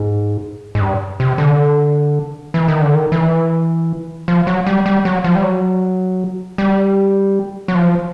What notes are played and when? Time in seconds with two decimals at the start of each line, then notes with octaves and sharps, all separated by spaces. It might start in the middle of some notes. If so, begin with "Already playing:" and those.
Already playing: G#2
0.75 G#2
0.80 G2
1.20 C3
1.38 D3
2.54 E3
2.68 D#3
2.81 D3
2.94 D#3
3.12 E3
4.28 F3
4.47 F#3
4.67 G3
4.86 G3
5.05 F#3
5.24 F3
5.35 G3
5.43 F#3
6.58 G3
7.68 F#3
7.75 F3